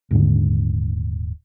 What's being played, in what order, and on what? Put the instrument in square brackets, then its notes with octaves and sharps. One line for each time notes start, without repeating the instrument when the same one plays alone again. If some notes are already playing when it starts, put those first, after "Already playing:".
[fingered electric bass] D#1 G#2 D3